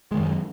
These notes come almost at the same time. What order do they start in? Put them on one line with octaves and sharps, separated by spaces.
G#3 D#3 F#2